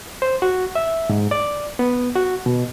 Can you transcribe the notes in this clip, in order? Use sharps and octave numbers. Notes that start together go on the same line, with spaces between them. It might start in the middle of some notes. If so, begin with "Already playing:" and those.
C5
F#4
E5
G#2
D5
B3
F#4
B2